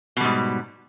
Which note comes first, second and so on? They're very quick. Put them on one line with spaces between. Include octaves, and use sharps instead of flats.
B2 G3 G#2